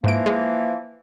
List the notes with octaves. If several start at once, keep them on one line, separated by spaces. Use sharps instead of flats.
G#2 E3 F3 A#3 D7
G#3